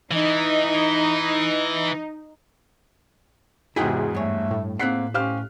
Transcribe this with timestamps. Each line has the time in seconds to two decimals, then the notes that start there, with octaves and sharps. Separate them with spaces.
0.11 E3 D#4
3.76 E2 G#2 C3 E4 F#4 G#4 G5 B6
4.15 G2 A3 C#5
4.51 A2
4.79 A#3 C4 G#4 F#5 F#6 B6 C7
5.14 C#4 G4 C5 F5 F6